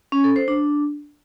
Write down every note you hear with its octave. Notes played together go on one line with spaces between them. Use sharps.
C#4
A4
C5
D4